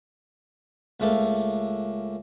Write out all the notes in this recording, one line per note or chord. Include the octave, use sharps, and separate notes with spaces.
C#2 A3 A#3